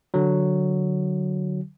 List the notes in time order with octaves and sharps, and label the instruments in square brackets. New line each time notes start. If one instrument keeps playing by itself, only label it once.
[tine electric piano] D3 F#3